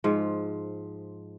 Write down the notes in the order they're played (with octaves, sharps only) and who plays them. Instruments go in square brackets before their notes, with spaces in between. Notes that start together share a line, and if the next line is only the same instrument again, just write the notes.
[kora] G#2 F3